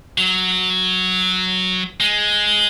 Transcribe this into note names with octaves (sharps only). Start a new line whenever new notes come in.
F#3
G#3